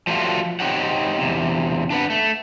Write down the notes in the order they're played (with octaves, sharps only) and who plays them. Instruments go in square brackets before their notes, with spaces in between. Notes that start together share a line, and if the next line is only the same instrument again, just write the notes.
[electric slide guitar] F3 G3 A3 F4 F#4
C4 D#4 G4 C#5 F#5
E2 C3
D4 B4 F#5
A3